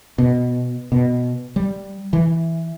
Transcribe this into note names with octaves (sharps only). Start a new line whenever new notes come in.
B2
B2
G3
E3